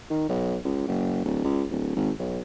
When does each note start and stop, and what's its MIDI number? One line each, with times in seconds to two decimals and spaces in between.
0.10 0.25 51
0.29 0.56 35
0.65 0.84 37
0.88 1.21 30
1.25 1.43 26
1.44 1.64 37
1.71 1.94 26
1.96 2.11 32
2.19 2.40 35